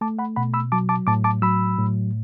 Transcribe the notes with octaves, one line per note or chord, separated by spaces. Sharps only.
A3 A5 D6
F#5 B5
B2 F#5 B5
B5 E6
F#3 A5 D6
A5 D6
A2 A5 D6
A5 D6
F#3 B5 E6
A2